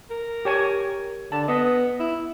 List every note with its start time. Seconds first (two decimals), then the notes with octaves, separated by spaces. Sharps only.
0.10 A#4
0.45 G4 C#5 G#5
1.32 D3 A5
1.48 B3 D#5
2.00 E4